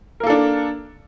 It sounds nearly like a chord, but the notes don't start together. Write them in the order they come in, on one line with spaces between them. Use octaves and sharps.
A#4 A#3 A4 D4